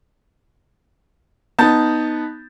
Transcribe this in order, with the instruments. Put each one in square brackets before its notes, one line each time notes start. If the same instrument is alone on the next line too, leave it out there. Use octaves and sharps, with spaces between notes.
[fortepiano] B3 D#4 [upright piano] A5 G6 A6